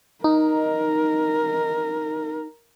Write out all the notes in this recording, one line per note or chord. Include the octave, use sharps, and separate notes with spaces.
D#4 A#4